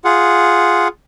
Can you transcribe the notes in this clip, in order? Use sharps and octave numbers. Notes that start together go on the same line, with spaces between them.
F4 G#4 F#5